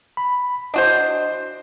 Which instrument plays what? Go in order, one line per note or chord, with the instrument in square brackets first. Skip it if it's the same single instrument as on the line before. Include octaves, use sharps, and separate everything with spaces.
[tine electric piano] B5
[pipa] D4 F#4 C5 [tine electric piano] D#5